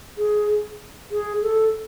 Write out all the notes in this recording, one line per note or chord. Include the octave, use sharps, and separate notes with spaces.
G#4
G#4
A4